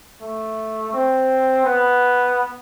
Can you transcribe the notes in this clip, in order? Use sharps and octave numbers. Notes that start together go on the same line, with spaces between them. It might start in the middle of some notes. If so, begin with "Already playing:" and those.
A3
C4
B3